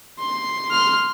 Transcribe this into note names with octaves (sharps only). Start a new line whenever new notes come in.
C6
C6 F6